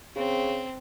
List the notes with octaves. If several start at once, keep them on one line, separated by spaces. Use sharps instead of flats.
C#3 C4